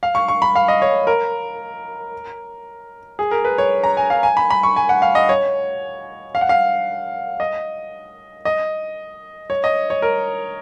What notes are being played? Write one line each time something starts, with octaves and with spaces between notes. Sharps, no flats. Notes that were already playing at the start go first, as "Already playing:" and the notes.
F5
C#6
C#6
B5
F5
D#5
C#5
A#4
G#4
A#4
B4
C#5
A#5
G#5
F5
G#5
B5
B5
C#6
G#5
F#5
F5
D#5
C#5
F5
F#5
F5
D#5
D#5
C#5
D#5
C#5
A#4